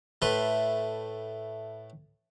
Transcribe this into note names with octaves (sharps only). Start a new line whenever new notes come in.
A2 A3 B4 C6